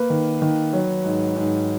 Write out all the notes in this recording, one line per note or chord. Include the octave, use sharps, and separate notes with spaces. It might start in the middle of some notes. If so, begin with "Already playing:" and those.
Already playing: A#3 B4
D#3
D#3
F#3
G#2
G#2